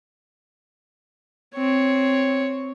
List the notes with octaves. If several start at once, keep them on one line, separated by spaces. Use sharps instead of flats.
C4 C#5